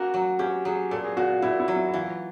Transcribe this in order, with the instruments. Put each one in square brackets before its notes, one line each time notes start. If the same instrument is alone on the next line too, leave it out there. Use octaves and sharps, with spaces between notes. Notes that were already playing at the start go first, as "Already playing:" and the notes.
Already playing: [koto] A3 A#3 C#4 [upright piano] F#4
[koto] F#3
[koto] C#4 [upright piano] G4
[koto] F#3 [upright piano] G#4
[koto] A#2 [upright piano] A4
[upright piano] G#4
[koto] A#2 [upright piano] F#4
[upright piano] F4
[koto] A#2 [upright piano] E4
[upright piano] E4
[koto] F#3
[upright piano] E4
E4
[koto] E3 [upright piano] F4